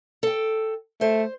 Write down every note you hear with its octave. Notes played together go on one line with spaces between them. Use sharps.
A4 G5
A3 C5